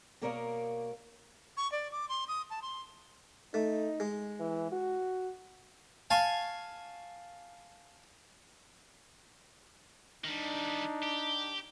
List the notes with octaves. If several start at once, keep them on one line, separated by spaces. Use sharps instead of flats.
B2 A#3 A#4 C#5 D5 F5
C#6
D5
D6
C6
D#6
A5
C6
A3 D#4
G#3
E3
F#4
F5 G#5 A5 C#6
D#3 G3 D4 D#4
G4